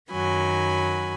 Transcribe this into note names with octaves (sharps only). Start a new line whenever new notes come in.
F#2 D#3 F#3 G#5 B5